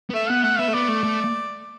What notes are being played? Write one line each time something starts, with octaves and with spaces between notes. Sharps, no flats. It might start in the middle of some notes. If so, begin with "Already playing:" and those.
B3
A3 E5
B3 F#5
A3 F#5
B3 E5
A3
B3 D5
A3
A3